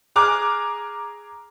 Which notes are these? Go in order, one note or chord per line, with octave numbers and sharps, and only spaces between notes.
G#4 A#5 D6 F6 F#6